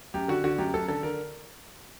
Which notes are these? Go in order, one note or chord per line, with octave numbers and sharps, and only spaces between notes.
F#2 G4
D3 F#4
D3 F#4
F#2 G4
F#2 A4
D3 A4
D3 A#4